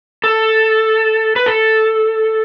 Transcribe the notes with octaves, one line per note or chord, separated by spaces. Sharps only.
A4
B4
A4